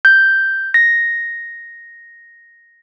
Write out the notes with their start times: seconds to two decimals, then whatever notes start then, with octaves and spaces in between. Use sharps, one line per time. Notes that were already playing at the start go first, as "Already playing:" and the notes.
0.05 G6
0.74 A#6